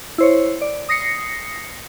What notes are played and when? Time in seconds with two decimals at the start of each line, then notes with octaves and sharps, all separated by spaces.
0.18 E4 C5 C#5
0.61 D5
0.89 D#6 A#6 C7 C#7